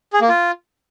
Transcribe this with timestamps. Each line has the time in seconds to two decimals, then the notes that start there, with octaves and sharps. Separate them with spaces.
0.13 G#4
0.21 A#3
0.29 F4